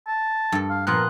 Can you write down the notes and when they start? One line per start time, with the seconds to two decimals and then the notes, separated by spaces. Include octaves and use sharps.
0.07 A5
0.52 G2 A4
0.70 F5
0.87 A#2 F3 B3 A#4 C6 D#6 F#6